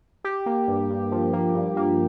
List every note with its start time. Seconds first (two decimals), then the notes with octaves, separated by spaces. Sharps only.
0.24 G4
0.46 A#3
0.68 G2
0.90 G2
1.12 F3
1.33 A#3
1.55 G2
1.77 A#3